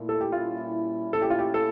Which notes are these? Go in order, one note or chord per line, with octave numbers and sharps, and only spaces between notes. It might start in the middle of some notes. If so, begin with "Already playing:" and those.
Already playing: A#2 A3 E4
A4
G4
A#2 G3 C#4 E4 F4
A#2 A3 C#4 E4 A4
G4
F4
G4
A4